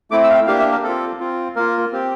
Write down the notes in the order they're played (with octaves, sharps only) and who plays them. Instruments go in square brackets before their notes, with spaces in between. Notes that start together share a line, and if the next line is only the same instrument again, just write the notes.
[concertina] A3 C4 E4 D6
E6
F5
G5
A#3 D4 G4 F5
E5
A#4
C4 F4 A4
C4 F4
A#3 F4 A#4
C4 G4